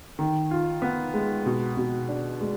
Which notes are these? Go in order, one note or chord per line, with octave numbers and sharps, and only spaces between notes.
D#3
F4
B3
G#3
B2
B2
D4
G#3